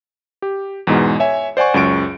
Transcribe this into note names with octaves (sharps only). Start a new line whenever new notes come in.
G4
E2 G#2 B2 G#3
C#5 E5 G#5
C5 D5 F#5 G#5 C#6
C#2 F#2 C#6 D7